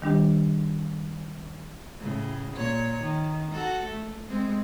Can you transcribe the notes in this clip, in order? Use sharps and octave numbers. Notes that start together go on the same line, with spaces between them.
D#3 G3 D4 G4
A2 C#3
A#2 C#5
D#3
F#4 A4
A3
G#3 C4